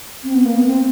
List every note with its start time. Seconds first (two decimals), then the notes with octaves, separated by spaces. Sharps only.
0.24 C4
0.35 B3
0.45 A#3
0.55 B3
0.67 C4